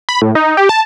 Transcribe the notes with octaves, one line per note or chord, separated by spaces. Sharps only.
B5
A2
D#4
G4
A5